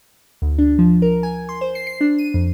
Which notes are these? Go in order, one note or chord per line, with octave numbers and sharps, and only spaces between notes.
D2
D4
F3
A#4
G#5
C6
C5
C7
C7
D4
D#7
F2